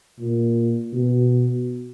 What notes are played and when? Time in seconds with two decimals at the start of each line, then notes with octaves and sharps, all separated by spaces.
0.19 A#2
0.93 B2